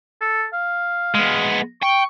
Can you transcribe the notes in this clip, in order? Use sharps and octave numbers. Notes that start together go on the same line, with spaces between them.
A4
F5
G#3 B3
G5 C#6